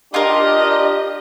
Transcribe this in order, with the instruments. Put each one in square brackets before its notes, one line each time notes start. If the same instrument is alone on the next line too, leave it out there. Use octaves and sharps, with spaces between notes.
[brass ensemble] D4 G4 [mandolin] F4 A#4 [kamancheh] D#5